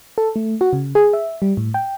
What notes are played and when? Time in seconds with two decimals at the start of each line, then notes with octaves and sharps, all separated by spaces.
0.18 A4
0.36 A3
0.61 F#4
0.73 C#3
0.95 G#4
1.13 E5
1.42 G3
1.57 A2
1.74 G5